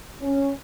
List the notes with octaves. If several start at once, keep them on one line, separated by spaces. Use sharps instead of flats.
C#4